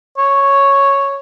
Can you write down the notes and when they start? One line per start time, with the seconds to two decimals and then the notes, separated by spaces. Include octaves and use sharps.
0.18 C#5